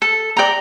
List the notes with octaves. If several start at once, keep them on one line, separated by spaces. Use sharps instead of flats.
A4
D5 G5 A#5